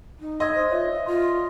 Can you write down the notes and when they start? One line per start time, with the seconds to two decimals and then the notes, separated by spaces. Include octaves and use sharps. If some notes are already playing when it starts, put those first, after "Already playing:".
0.19 D#4
0.40 D#5 C6 E6 G#6
0.56 C5
0.71 F4 C#5 D5 E5
0.93 F5
1.06 F4 C6